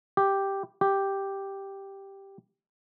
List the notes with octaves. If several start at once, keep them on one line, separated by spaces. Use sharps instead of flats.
G4
G4